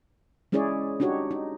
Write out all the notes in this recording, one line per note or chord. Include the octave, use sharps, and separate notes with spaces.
G#3 C#4 E4 G#4 C#5 D5
D4 D#4 F#4 G4 C#5
D#4